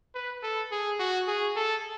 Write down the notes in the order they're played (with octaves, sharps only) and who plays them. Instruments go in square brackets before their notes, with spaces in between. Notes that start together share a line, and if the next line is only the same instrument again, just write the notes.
[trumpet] B4
A4
G#4
F#4
G#4
A4